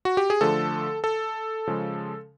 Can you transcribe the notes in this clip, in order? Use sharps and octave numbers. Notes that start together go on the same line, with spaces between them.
F#4
G4
G#4
D3 F3 A3 A4
A4
C#3 F3 G#3